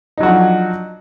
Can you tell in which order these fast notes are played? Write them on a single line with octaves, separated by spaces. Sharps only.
D#4 F#3 F#4 F3 D4